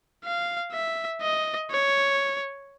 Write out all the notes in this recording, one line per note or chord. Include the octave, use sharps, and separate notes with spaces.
F5
E5
D#5
C#5